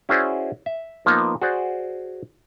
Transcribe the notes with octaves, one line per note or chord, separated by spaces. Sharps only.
C#4 E4 F#4 G#4 C5 D5
E5
F3 A#3 B3 D#4
F#4 G#4 C5 D5